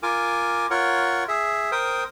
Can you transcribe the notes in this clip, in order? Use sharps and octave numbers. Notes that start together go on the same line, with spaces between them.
F4 A#4 G#5 D6
F4 A#4 C#5 F#5
G#4 E5
A#4 C5 G5 D#6